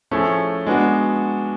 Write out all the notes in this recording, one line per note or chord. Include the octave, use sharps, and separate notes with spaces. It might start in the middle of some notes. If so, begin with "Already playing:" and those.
F3 A3 C#4 E4 G#4
G#3 B3 D4 F#4